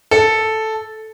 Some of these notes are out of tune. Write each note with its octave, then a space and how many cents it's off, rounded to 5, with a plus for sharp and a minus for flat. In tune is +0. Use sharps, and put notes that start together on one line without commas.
A4 -5